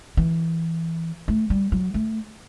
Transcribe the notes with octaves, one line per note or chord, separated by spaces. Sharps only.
E3
A3
G3
F#3
A3